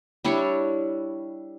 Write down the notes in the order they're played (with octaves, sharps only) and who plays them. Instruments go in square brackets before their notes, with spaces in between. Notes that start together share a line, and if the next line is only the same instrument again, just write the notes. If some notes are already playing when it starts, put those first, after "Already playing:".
[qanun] G3 D4 E4 C#5